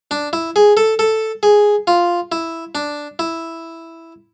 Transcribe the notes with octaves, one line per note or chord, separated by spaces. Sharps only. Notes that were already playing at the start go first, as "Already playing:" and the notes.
D4
E4
G#4
A4
A4
G#4
F4
E4
D4
E4